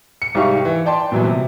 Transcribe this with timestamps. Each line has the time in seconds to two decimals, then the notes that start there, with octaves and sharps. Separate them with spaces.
0.22 C#7
0.35 C2 G#2 G4 F5 C#6
0.65 E3
0.86 D5 G5 A5 C6
1.12 A#2 E3 F#3 G3 B3
1.25 C3